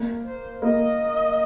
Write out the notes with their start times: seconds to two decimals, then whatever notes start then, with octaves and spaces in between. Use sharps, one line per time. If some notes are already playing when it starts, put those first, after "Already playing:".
Already playing: A#3
0.24 C5
0.62 A#3 D#5